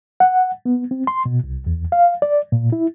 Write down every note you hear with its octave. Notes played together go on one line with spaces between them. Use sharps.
F#5
B3
C4
C6
B2
C2
E2
F5
D5
A#2
E4